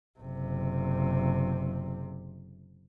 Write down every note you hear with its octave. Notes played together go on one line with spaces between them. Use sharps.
F#1 C3